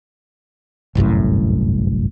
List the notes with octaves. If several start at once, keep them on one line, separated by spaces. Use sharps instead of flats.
G1 C2 F#2 A2